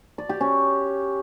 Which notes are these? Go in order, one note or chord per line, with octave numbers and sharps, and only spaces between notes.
D5
G4
C#4